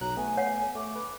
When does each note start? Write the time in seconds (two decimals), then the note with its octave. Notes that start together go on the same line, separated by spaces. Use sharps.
0.01 B1 F#3 A#5 F#6
0.17 A3 B3 G#5
0.37 C#5 F5 F#5
0.75 A3 D6
0.96 B4